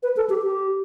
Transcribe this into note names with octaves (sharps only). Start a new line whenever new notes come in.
B4
A4
G4
G4